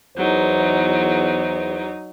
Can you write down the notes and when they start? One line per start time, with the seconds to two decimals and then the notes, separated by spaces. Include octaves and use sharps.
0.17 E2 F#3 D#4 C5